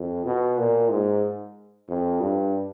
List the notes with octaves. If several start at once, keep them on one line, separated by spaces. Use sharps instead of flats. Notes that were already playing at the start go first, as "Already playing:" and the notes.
Already playing: F2
B2
A#2
G#2
F2
G2